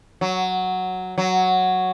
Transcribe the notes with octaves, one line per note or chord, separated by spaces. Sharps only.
F#3
F#3